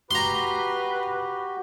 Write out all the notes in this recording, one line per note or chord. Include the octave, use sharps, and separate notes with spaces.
F#4 G4 B4 A#5 C6